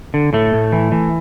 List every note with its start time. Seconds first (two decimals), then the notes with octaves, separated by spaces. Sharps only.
0.14 D3
0.33 A2 A3
0.53 A2
0.72 E3
0.92 E3